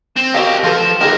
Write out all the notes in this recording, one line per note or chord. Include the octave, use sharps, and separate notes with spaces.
C4 E7
F#4 G4 A#4 D#5 F5 A#6
F3 F4 A4 B4
E7
C#2 D#4 G4 G#4 A#4